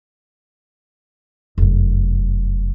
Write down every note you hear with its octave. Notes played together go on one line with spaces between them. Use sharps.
F1 F#2